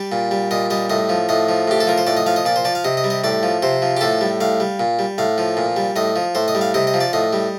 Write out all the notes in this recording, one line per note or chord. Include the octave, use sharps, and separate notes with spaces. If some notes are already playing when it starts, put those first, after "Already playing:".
Already playing: G3 D5
A#2
G3
A#2 D#5
G3 D#5
A2 D#5
F3
A2 D#5
F3
A2 G4
A4
F3 A#4
C5
A2 D5
D#5
F3 F5
D#5
A#2 D5
C5
F3 D5
F5
C3 D#5
D#5
G3
D#5
A2 D5
F3
C3 C5
F3
G4
A2 A4
G3
A2 F5
G3
A#2
G3
A2 F5
F3
A#2
G3
A2 D#5
F3
A2 C5
D#5
G3
F5
C3 D#5
D#5
F3
D5
A2 D#5
G3